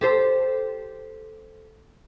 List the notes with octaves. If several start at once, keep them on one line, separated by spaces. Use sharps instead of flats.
G4 A4 C5